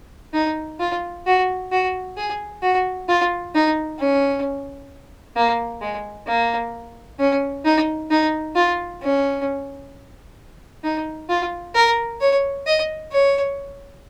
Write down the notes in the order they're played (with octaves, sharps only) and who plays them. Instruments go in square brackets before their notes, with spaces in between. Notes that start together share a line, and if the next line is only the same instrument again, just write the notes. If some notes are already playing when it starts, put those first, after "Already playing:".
[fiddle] D#4
F4
F#4
F#4
G#4
F#4
F4
D#4
C#4
A#3
G#3
A#3
C#4
D#4
D#4
F4
C#4
D#4
F4
A#4
C#5
D#5
C#5